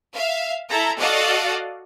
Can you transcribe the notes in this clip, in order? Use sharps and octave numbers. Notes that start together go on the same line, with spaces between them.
E5 F5
E4 A4 A#5
F#4 A4 D5 D#5 F5 F#5